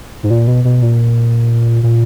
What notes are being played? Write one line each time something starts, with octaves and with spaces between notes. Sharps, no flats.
G#2
A#2
B2
B2
A#2
A#2